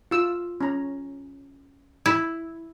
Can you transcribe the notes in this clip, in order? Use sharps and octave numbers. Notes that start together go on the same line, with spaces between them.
F4 E6
C#4 A#5
E4